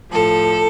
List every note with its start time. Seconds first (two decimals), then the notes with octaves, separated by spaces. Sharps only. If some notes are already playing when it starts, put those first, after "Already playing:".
0.11 A2 F3 A4